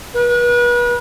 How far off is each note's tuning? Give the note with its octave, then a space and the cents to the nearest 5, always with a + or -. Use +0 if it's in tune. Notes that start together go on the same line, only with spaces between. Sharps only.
B4 -35